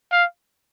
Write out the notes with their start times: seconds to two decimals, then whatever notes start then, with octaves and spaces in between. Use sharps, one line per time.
0.12 F5